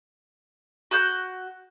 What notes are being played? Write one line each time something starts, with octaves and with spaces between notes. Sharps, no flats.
F#4 F#6 G6